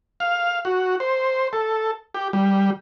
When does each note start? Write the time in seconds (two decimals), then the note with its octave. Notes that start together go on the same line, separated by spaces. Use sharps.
0.20 F5
0.65 F#4
1.00 C5
1.53 A4
2.14 G4
2.33 G3